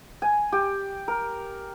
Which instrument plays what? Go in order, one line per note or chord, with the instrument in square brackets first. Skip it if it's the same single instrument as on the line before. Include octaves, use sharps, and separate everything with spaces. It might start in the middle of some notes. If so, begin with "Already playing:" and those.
[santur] G#5
G4
A#4